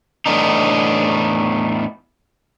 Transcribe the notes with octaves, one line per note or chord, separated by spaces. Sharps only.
E2 A2 B3 D4 D#4